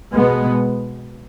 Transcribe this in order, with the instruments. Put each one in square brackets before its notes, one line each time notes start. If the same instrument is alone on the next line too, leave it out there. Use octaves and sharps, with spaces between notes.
[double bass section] B2 G#3 B3